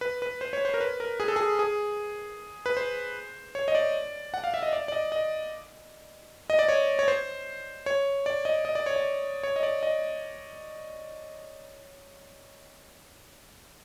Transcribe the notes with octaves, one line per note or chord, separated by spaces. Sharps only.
B4
B4
C5
C#5
C5
A#4
B4
A#4
G#4
A4
G#4
G#4
B4
C5
C#5
D#5
D5
F#5
F5
E5
D#5
D5
D5
D#5
D#5
D#5
D5
C#5
C#5
C5
C#5
D5
D#5
D#5
D5
C#5
D5
C#5
D#5
D5
D#5